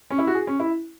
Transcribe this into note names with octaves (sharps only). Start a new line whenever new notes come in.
C#4
E4
F#4
G#4
C#4
E4